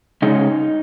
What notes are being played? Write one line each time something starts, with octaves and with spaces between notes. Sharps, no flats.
C#3 G#3 C#4 D#4